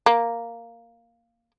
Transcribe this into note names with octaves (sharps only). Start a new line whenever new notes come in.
A#3